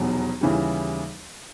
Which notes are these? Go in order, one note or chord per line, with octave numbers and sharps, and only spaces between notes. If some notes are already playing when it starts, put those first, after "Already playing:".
Already playing: F1 E2 B2 F#3
D#2 C#3 E3 G3